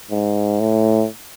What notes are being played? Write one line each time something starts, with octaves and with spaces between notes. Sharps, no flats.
G#2
A2